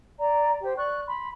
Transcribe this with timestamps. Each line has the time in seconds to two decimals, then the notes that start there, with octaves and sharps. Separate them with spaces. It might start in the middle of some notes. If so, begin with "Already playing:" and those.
0.18 D5 A#5
0.62 G4 C5 G5
0.76 D5 C#6 F#6
1.06 B5 C6